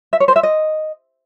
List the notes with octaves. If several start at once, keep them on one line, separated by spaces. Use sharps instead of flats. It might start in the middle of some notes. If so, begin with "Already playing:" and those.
E5
C#5
C5
E5
D#5